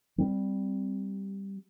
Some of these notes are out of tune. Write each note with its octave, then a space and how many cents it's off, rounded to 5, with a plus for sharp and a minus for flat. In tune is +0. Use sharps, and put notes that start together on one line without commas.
G3 +0 C4 +0